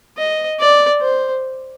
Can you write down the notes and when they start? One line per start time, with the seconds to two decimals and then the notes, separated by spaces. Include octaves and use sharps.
0.18 D#5
0.59 D5
1.01 C5